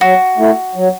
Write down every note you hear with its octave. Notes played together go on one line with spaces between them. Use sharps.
F#3 F#4
A3 E4
F#3